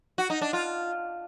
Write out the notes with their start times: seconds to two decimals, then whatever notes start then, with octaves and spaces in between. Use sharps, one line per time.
0.18 F#4
0.30 D#4
0.41 D4
0.53 F4